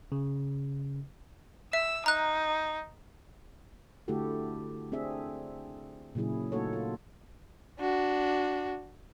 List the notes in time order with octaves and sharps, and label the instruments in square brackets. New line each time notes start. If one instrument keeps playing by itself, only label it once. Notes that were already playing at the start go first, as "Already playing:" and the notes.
[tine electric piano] C#3
[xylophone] E5 [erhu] E6
[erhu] D#4 [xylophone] A#5 F#6
[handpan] D3 A3 E4 F#4 G4 A4
C4 D4 G#4 E5
A#2 C#3 F#3 E4 G#4
A3 A#3 D#4 F#4 A4 C#5
F4 F#4
[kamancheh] D4 F#4